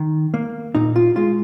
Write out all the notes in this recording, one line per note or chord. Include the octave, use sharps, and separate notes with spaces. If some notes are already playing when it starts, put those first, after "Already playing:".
Already playing: D#3
A#3
A#2 D#4
F4
G#3 F4